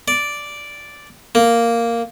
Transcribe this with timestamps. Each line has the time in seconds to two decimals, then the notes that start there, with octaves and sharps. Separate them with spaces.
0.08 D5
1.35 A#3